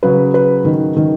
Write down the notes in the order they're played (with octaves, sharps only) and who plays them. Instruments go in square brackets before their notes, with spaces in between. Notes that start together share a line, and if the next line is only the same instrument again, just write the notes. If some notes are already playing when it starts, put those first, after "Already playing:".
[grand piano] C#3 F#3 [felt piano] B4
[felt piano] B4
D#3
D#3